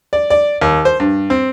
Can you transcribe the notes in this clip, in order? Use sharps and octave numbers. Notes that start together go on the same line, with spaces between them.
D5
D5
D#2
C5
G2
C4